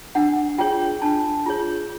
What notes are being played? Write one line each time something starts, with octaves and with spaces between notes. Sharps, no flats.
D4 F#5
F4 G#4 C#5 G5
D4 A5
F4 G#4 C#5